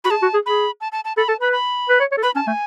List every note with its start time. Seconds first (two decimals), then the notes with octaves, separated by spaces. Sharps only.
0.04 F#4 B5
0.10 G#4 A5
0.22 F#4
0.34 G#4
0.45 G#4 B5
0.81 A5
0.92 A5
1.05 A5
1.17 A4 B5
1.28 A4 A5
1.40 B4 B5
1.52 B5
1.89 B4
2.00 C#5
2.12 C#5
2.17 A4
2.23 B4 B5
2.35 C#4 A5
2.47 A3 G#5